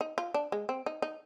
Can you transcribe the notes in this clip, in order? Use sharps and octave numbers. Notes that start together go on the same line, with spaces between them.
D#4
F4
D4
G#3
C4
D#4
D#4